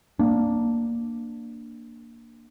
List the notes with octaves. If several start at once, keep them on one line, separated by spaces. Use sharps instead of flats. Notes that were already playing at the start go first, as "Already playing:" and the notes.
A#3 D4